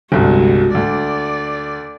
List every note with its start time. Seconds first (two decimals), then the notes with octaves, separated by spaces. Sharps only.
0.12 G1 C2 G#3 F#4
0.75 D2 D5